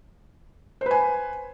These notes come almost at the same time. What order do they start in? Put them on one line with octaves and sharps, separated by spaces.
C5 B4 G#5